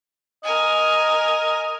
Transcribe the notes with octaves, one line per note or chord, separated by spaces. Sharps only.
A#4 D#5 G#5